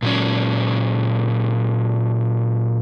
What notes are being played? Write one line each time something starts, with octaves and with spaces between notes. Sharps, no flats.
A#2 F#3 C#4